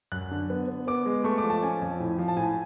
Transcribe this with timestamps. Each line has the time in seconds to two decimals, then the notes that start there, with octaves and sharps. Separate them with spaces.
0.12 F#2 F#6
0.31 D3
0.50 B3
0.68 B3
0.88 B3 D6
1.05 G#3
1.24 A3 C#6
1.38 D6
1.44 F3
1.50 A5
1.62 C#4 G#5
1.82 F2
2.00 A2
2.19 F3
2.28 A5
2.37 A2 G#5